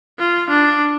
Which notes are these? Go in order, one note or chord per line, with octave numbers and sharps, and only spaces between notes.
F4
D4